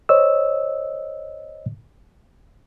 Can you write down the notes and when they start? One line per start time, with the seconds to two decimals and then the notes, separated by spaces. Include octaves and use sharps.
0.09 C5 C#5 D#5 E6